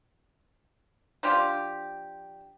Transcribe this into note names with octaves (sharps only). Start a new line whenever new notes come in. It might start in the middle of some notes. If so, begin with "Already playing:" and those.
F3 D4 F4 G4